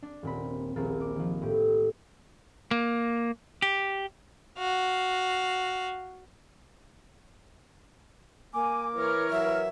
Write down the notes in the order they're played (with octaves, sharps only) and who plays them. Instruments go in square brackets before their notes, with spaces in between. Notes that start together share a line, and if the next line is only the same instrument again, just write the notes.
[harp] D4
D#1 A#2 C4 B5
D#1 A#1 A#3 A6
D6
D#3 F3
A2 G4
[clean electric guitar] A#3
G4
[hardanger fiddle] F#4 F5
[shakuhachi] A#3 [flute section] G#5 [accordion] D6
[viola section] E3 A#4 C#5 [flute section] F6
[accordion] F#3 [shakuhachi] E5